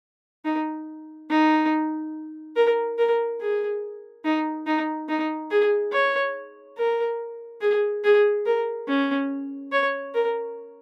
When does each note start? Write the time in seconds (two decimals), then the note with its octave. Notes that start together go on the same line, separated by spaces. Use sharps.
0.45 D#4
1.30 D#4
2.56 A#4
2.98 A#4
3.40 G#4
4.25 D#4
4.66 D#4
5.09 D#4
5.51 G#4
5.93 C#5
6.77 A#4
7.61 G#4
8.04 G#4
8.46 A#4
8.88 C#4
9.72 C#5
10.14 A#4